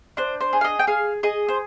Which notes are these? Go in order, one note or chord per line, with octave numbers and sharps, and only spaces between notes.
D4 C5
C5
G#4
F5
D#5
G5
G#4 F5
G#4 D#5
C5